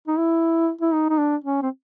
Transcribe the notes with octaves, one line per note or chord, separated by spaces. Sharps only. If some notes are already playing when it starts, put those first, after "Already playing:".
D#4
E4
E4
D#4
D#4
D4
C#4
C4